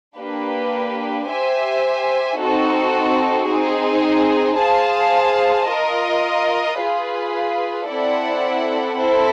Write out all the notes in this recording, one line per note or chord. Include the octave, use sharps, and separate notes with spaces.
A#3 D4 G4 B4
G4 C5 E5 G#5
C4 D#4 F#4 A4
C4 D#4 G#4
G#4 C5 F5 A5
F4 A#4 D#5
F4 G#4 B4
C4 E4 A4 D5 F#5
C4 E4 A4 C5